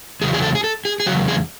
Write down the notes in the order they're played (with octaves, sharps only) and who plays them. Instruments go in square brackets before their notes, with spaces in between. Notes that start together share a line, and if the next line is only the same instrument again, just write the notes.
[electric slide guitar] E2 C#3 F#3 G#4
G#4
A4
G#4
A4
G#4
G#4
E2 C#3 F#3 F#4
G#4